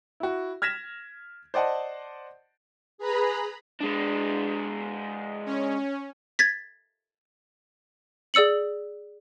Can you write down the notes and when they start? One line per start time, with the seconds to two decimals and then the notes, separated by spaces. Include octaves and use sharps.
0.20 E4 F#4
0.62 F6 G#6 A#6 B6 E7
1.54 C5 D5 D#5 F#5 A5
2.98 G#4 B4 A#5 B5
3.80 G#3 D4
5.46 C#4
6.39 G#6 A6 B6
8.34 G#4 D5 E6 C#7 F#7